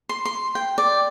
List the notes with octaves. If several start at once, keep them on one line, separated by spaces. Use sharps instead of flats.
C6
C6
G5
D5